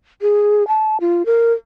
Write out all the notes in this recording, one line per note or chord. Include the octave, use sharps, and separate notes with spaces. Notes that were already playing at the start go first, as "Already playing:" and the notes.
G#4
A5
F4
A#4